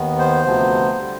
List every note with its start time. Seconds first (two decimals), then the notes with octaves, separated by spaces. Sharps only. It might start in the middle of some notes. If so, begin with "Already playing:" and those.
Already playing: D#2 D#3 B3
0.19 C5
0.44 D2 C3 F3 B3
0.98 D3 G3